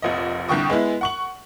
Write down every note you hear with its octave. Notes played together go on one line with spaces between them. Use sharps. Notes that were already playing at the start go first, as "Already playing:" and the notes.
F1 A#1 D#5
C2 D3 G5 C#6 D#6
G#3 B3 E4
F#5 C#6 F#7